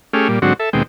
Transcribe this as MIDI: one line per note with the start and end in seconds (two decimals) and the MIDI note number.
0.13 0.28 57
0.13 0.28 61
0.13 0.28 67
0.13 0.28 68
0.13 0.28 89
0.28 0.39 46
0.28 0.39 55
0.42 0.53 44
0.42 0.53 50
0.42 0.53 54
0.42 0.53 60
0.42 0.53 66
0.59 0.70 69
0.59 0.70 76
0.73 0.83 39
0.73 0.83 47
0.73 0.83 56
0.73 0.83 60
0.73 0.83 79